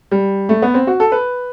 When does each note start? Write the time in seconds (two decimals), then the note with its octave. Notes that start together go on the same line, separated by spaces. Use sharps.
0.11 G3
0.49 A3
0.62 B3
0.74 C4
0.87 F#4
1.00 A4
1.12 B4